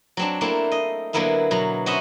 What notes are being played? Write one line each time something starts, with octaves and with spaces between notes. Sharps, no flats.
F#3 C4 D4
A3 A#3 C4 D4 E4
D#5
D3 F#3 A#3 B3 E4 F5
B2 F#3 A#5
C#4 F#4 C5 D#5 E5 B5